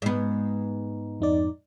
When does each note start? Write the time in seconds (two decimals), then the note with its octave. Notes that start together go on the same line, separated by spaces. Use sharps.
0.02 G#2 B3
1.20 F2 D#4 D5